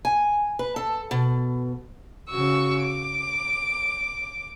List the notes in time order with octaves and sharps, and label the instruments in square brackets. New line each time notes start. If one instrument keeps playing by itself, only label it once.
[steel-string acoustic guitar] G#5
B4
A4
B2
[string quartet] C#3 F#4 C#6 E6
D6